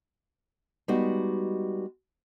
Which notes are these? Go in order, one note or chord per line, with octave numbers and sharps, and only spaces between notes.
G3 G#3 B3 D#4 F#4 G4